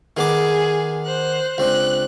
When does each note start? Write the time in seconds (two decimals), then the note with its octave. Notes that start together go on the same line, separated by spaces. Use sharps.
0.17 D#3 B3 G#4 D6
1.05 C5 F#6
1.58 C#2 C4 D4 F#6